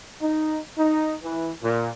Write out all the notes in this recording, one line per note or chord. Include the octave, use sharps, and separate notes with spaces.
D#4
D#4
E3
A#2